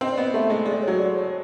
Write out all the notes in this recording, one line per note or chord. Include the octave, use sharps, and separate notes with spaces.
C4 D#5
D5
B3 D#5
A3 E5
G#3 D#5
G#3 D5
C#5
F#3
D5
C#5